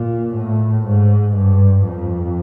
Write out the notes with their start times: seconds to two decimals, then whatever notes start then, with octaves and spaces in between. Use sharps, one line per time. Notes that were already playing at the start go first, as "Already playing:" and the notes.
Already playing: A#2
0.35 A2
0.86 G#2
1.37 G2
1.88 F2